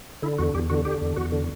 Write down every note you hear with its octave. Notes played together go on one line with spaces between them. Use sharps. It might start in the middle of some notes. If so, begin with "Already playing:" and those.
D3 E4
E2 F#4
E2 G4
D3 F#4
D3 G4
E2
E2 F#4
D3